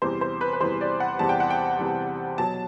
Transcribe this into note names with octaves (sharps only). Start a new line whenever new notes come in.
E2 C3 E3 G3 C5
C5
B4
B4
E2 C3 E3 G3 C5
D5
F#5
E2 C3 E3 G3 A5
G5
F#5
G5
E2 C3 E3 G3
B2 F#3 A5